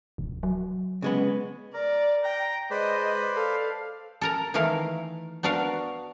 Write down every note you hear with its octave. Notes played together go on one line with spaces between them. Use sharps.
D1
F#3
C#3 G#3 B3
A#4 D5
G5 A#5
G#3 B4 C5 D5 D#5
A4 F5
A4 A#4 A#5
D#3 E3 A3 A#4 F5
B3 D4 F#4 A#4 F5